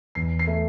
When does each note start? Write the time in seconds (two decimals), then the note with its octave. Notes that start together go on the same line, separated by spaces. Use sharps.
0.15 E2 C7
0.39 C7
0.47 A3